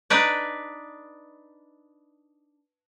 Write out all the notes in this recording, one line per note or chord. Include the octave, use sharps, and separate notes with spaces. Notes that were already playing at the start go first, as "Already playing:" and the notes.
D4 D#4 B4 D5